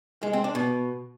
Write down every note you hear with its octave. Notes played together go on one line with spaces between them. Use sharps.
G#3
C4
D4
B2